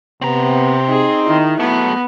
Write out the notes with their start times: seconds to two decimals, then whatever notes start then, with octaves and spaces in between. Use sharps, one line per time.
0.22 C3 B3 C4 A#5
0.89 D#4 G#4
1.26 D#3 E4
1.60 F#3 A3 B3